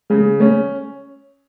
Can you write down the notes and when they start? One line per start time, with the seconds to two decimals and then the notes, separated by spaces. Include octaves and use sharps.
0.10 C#3 G#3
0.40 A3 C#4